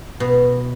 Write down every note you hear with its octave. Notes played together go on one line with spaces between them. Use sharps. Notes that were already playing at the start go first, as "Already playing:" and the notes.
B2